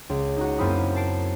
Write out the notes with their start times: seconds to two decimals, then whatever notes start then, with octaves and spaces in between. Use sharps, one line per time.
0.10 C#2
0.37 D#4 F#4
0.58 F#2 A#3 C4 E4 B5 D#6
0.95 A5 C7 D7